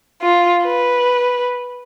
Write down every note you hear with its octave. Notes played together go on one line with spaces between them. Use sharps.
F4
B4